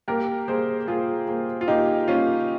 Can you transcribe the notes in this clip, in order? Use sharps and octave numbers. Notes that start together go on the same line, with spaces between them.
A#3 G4 A#4
A#3 G#4 C5
A#3 F4 G#4
A#3
F4
A#3 D#4 G4
A#3 C#4 F4